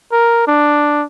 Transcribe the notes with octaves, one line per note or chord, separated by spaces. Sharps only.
A#4
D4